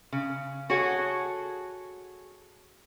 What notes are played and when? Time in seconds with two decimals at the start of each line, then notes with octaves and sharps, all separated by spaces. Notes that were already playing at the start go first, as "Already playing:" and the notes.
0.12 C#3
0.70 F#4 G#4 A4 C#5 F#5